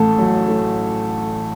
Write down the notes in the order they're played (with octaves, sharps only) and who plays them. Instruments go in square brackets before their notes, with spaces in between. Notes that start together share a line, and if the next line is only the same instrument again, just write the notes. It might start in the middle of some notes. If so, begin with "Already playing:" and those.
Already playing: [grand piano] A1 A2 A3 [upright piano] A4
[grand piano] F#3
A3